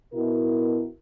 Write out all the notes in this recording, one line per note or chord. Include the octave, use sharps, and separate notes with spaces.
B2 E4 A#4